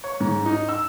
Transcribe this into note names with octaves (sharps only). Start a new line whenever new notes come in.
C#5
G#2
D#4
E6